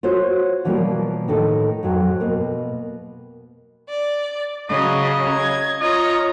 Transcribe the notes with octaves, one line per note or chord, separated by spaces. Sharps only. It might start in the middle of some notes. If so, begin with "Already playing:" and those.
F4 F#4 C5 C#5
B2 E3 F3 G3 A#3
A2 D#3 A4
F2 G#2 F#3
B2 A#3
D5
C#3 F#3 D#5
G#6
F4 C#5 D#5 A#5